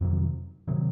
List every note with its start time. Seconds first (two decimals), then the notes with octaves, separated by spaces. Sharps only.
0.01 F2 C3 D#3 F#3
0.67 C3 D#3 F#3